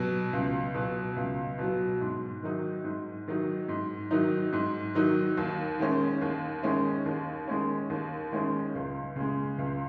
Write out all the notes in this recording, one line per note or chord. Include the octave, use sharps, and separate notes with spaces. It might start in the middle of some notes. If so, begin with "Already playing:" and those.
Already playing: B2 F#3
C#2
B2 F#3
C#2
B2 F#3
G#2
D#3 F#3 D#4
G#2
D#3 F#3 D#4
G#2
D#3 F#3 D#4
G#2
D#3 F#3 D#4
D#2
D#3 G#3 C#4
D#2
D#3 G#3 C#4
D#2
D#3 G#3 C#4
D#2
D#3 G#3 C#4
C#2
C#3 G#3
C#2